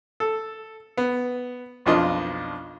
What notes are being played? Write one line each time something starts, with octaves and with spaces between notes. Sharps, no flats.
A4
B3
B1 F2 D4 F4 D#5